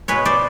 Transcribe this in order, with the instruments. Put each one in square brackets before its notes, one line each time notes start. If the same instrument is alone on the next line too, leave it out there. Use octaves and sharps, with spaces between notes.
[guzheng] B2 G#3 B4 C#5
C5 D5